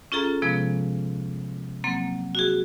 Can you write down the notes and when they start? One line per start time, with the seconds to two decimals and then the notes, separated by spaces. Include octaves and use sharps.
0.12 C#4 F4 G#4 A4 A#5
0.42 C3 F3 G#3 B3
1.84 F#3 A#3 C4
2.35 F#4 G#4